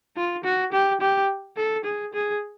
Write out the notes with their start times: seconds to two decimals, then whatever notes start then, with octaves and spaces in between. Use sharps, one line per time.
0.16 F4
0.44 F#4
0.72 G4
1.01 G4
1.57 A4
1.85 G#4
2.13 G#4